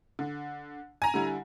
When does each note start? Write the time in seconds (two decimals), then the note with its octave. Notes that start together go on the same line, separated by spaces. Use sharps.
0.19 D3
1.02 G#5 A#5
1.14 D3 G3 E4